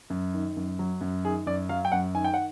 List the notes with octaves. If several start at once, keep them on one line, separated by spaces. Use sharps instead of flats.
F#2
D#3
F#2
F#3
F#2
D#3 G#4
F#2 D5
F#3 F5
G5
F#2 F#5
D#3 G#5
G5
F#5